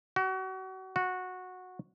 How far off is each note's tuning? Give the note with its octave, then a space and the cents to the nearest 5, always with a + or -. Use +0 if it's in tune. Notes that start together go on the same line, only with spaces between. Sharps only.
F#4 +35
F#4 -10